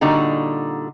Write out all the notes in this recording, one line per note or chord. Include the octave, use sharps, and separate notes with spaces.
A#2 D3 G3 D#4 F#4